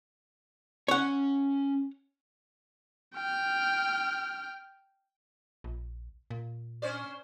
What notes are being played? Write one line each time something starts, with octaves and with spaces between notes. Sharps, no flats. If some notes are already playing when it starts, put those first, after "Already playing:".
C#4 C#5 F#5
G5 F6
A#1
A#2
C#4 C5 D5